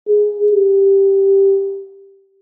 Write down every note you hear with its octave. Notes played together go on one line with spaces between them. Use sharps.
G#4
G4